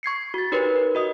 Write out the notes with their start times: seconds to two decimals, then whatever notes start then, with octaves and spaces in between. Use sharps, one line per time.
0.03 C#6 G#6 C7 C#7
0.34 F#4 A6
0.52 D#4 G4 A#4 B4 C#5
0.75 A#4
0.95 F#4 D#5 D#6